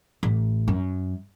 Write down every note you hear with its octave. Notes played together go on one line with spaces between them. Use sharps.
A1
F#2